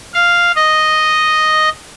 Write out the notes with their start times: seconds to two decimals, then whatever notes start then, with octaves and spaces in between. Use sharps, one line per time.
0.14 F5
0.55 D#5